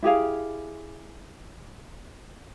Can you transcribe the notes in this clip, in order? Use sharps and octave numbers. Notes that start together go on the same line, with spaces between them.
E4 G4 G#4 F5